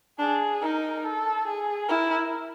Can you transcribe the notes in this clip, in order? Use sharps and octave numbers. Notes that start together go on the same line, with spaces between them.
D4 G#4
D#4 A#4
A4
G#4
E4 A#4